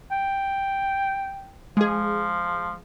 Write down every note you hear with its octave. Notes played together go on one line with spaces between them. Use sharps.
G5
F3 G#3 G#4